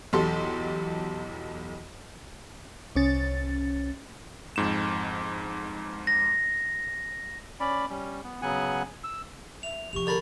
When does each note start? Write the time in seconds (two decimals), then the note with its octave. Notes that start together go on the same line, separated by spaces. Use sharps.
0.13 B1 E2 G4 A4 C6
2.96 C2 C#4 A6
4.56 F2 G#2 E7
6.07 A#6
7.60 C#4 D5 B5
7.90 G3 C#4
8.24 B3
8.42 C#3 F#3 B3 F#5 G#5
9.04 E6
9.63 E5 F7
9.93 C3 F3 G4 C#6 F7
10.07 D3 A#4 B5 A6 F7